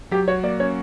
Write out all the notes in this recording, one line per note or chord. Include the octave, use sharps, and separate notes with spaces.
F#3 G4
F#4 C#5
A#3 D5
C#4 C#5